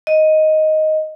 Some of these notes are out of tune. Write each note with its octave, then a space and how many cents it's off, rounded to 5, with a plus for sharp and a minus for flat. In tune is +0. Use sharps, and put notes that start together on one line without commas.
D#5 +5